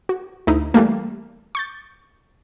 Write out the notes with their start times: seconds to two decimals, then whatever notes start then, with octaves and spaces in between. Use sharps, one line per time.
0.09 F#4
0.47 D2 D#4 E4
0.74 E3 G3 A3 A#3
1.55 C#6 G6 A6